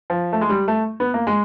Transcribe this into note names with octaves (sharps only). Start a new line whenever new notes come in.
F3
A3
G#3
G3
A3
B3
A#3
G#3